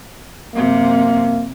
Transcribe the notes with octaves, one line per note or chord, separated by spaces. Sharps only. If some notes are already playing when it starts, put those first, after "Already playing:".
F#2 C3 A#3